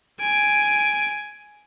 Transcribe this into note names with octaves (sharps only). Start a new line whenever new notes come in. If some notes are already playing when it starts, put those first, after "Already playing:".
G#5 D7